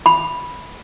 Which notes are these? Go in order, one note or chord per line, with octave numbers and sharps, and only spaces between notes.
B5